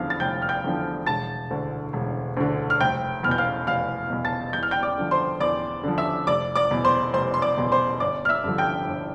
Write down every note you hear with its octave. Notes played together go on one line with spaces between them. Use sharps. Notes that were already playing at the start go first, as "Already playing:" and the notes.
Already playing: F1 E2 D3 F3 F5 F6
A6
F1 G5 G6
F6
G5 G6
E2 D3 F3
E1 A5 A6
D2 D3
E1
D2 D3
F6
F1 G5 G6
E2 F6
B2 G6
F5 F6
F1 F5 F6
E2 B2
A5 A6
E2 G6
F6
G5 G6
D5 D6
D3 F3
C5 C6
E2 D5 D6
D3 F3
E5 E6
F1 D5 D6
D5 D6
E2 B2
C5 C6
F1 C5 C6
C6
D5 D6
E2 B2
C5 C6
G1 D5 D6
F6
E5 E6
G2 D3 F3
G5 G6
G1